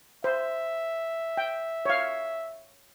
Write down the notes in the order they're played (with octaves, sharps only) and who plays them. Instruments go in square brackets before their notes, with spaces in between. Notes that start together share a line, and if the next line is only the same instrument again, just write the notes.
[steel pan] C5 [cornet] E5
[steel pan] G5
C#5 F5